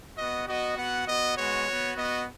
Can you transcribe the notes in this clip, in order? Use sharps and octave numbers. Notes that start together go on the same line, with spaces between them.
B3 F#4 D#5
B3 F#4 D#5
B3 F#4 F#5
B3 F#4 D#5
G#3 B3 F#4 C#5
B3 F#4
B3 F#4 D#5